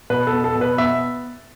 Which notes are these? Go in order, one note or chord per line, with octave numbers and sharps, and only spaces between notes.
B2 B4
A4
B3
A4
B2
B4
B3 E5